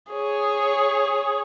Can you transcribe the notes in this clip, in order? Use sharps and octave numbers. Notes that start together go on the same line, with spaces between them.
G#4 C#5